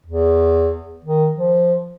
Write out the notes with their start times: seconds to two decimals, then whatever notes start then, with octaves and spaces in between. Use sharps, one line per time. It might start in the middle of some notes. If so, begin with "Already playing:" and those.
0.06 E2
1.05 D#3
1.38 F3